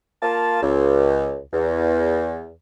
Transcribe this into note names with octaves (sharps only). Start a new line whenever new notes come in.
A#3 F4 A5
C#2
E2